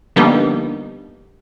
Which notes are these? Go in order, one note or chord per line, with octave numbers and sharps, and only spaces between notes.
D3 F3 G3 A#3 B3 D#4